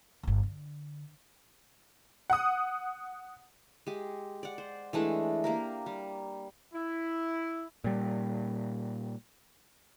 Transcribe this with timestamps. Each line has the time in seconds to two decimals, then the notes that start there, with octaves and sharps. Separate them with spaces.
0.23 D1 G1
0.43 D3
2.30 F#5 D#6
3.87 G#3 G4
4.43 D5 F#5
4.58 C5
4.93 E3 G#3 A3 D4
5.44 A#3 G4 A#4
5.86 G3
6.74 E4
7.84 A#2 G3